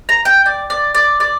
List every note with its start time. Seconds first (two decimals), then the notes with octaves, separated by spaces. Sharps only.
0.09 A#5
0.25 G5
0.46 D5
0.70 D5
0.95 D5
1.20 D5